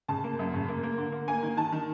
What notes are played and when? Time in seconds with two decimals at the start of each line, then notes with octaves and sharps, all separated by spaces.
0.08 C#3 A5
0.24 A#3
0.39 F#2
0.53 C#3
0.68 A#3
0.83 A#3
0.98 D3
1.12 A#3
1.28 A#3 G#5
1.43 D#3
1.57 D#3 A5
1.72 D#3